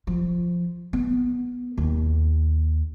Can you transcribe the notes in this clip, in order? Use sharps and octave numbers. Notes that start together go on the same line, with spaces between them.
F3
B3
D#2